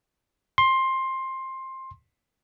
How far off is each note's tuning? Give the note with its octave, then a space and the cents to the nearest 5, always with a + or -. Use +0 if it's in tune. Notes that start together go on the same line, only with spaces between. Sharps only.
C6 +15